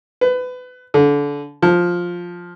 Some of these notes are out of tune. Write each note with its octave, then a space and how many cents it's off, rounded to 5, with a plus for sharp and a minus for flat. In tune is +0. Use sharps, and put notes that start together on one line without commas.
B4 +25
D3 -25
F3 +10